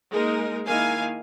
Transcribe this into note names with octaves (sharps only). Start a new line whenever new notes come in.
G#3 A#3 D#4 G#4 A#4
D#3 A#3 E4 F5 G#5